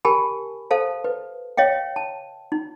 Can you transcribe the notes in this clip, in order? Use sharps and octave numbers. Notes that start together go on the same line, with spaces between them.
G4 A#4 G#5 A5 B5
A4 C5 F5 A5
B4
C#5 D#5 F5 G5
A5
D#4